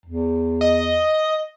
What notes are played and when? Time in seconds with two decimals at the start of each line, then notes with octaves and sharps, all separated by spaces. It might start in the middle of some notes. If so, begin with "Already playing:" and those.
0.06 E2
0.61 D#5